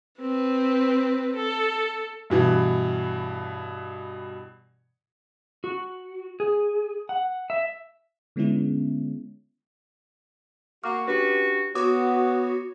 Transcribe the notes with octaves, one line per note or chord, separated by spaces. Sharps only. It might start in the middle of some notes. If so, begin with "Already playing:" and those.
C4 B4
A4
G2 B2 E3
F#4
G#4
F#5
E5
D3 G#3 B3 C#4 E4
A#3 F#4 C#6 D6 F6
C#4 D4 F#4 G4 B4
B3 F#4 B4 C#5 D6 D#6